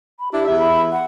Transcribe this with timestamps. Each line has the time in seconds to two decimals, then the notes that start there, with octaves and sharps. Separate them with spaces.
0.19 B5
0.32 D4 E4 G4
0.45 E2 E5
0.59 B5
0.92 F#5